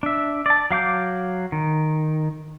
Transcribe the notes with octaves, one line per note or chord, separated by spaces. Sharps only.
D4 E5
D5 A5
F#3 F5 D6 G6
D#3